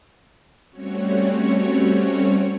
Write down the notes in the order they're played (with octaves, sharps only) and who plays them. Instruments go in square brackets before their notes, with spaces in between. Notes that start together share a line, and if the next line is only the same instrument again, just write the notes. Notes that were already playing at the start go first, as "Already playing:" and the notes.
[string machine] G3 A3 C4 C#4 F#4 C#5